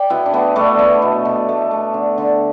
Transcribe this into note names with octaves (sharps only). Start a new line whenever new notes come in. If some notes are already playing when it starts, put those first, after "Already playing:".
Already playing: D5 G5
B2 B3 E4
D4
A3 B3
B2 A3 D4
A3 B3
B2
B2
A3
A3
D3
D3